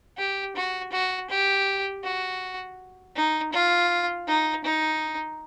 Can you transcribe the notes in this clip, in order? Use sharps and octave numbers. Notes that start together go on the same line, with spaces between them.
G4
F#4
F#4
G4
F#4
D#4
F4
D#4
D#4